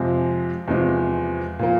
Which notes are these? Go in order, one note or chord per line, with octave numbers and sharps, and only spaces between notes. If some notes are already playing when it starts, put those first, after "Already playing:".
Already playing: F2 C3 F3 G#3
E2 C3 F3 G#3
A#2 F3 A#3